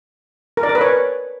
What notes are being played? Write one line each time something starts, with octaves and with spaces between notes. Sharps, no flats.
A#4
D5
A#4
B4
C#5